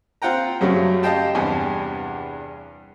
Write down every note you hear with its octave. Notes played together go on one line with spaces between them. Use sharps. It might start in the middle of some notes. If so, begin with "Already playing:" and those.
C4 F4 F#5 G5 A#5
F#2 C#3 F#3 G3 A3
G4 D#5 F5 G5 A5
E2 G2 C3 G#5